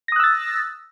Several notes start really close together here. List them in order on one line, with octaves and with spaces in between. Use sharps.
A#6 D#6 F#6 E6 A6